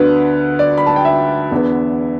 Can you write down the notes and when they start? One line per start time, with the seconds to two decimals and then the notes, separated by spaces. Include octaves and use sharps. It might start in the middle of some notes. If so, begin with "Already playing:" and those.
Already playing: D2 D3 B3 B4
0.59 D5
0.78 B5
0.87 A5
0.96 G5
1.05 E5
1.51 E2 D3 B3